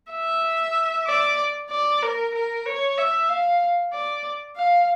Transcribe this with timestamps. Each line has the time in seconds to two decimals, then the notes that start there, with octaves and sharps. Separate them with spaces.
0.12 E5
1.07 D5
1.70 D5
2.03 A#4
2.34 A#4
2.66 C#5
2.98 E5
3.29 F5
3.93 D5
4.56 F5